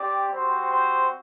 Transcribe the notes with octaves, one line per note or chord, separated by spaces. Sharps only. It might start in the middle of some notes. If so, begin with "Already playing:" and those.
Already playing: C4 G4 D5
G3 C4 F#4 C5
C5